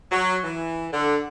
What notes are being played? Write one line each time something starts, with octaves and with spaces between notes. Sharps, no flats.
F#3
E3
D3